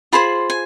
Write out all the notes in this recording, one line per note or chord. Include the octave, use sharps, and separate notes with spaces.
F4 G#4 C5 B5
G#5